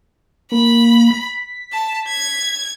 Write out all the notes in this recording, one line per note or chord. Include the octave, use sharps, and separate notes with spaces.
A#3 B5
B6
A5
G#6